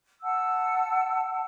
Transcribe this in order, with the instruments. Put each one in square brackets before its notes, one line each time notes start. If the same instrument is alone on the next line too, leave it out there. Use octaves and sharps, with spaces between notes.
[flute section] F#5 A5 E6